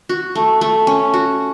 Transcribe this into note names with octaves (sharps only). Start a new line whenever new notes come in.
F#4
A3
A3
C#4
F#4